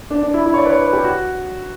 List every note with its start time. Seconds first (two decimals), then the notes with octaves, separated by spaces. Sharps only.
0.10 D4
0.23 D4
0.34 E4
0.46 E4
0.54 C#5
0.58 D5
0.66 B4
0.70 C#5
0.81 B4
0.93 G4
1.04 F#4